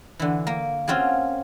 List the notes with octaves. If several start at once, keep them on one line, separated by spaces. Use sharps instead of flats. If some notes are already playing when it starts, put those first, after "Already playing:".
D3 E3
A#3
C4 C#4 F4 F#4 G#4